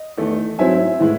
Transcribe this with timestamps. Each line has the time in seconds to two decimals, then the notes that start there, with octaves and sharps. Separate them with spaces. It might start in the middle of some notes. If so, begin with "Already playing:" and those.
Already playing: D#5
0.18 E2 D#3 A3
0.59 G#2 F#3 C4 E4 E5 G#5
1.00 A2 E3 G#3 E4